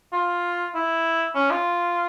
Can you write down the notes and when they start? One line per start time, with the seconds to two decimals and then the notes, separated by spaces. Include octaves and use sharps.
0.13 F4
0.75 E4
1.35 C#4
1.51 F4